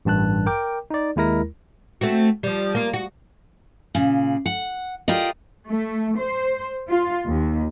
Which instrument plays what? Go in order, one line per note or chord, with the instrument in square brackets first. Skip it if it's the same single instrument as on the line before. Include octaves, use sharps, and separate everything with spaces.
[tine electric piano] A1 G2 A5 F#6
A#4 G5 D6
D#4 D5
D#2 G#3 E4 A#4 A#6
[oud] A3 C4 F#4
F3 G3
A#3 F4
F#4
[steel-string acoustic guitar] A#2 C#3
F#5
F4 G4 A#4 D5 D#5
[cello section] A3
C5
F4
D#2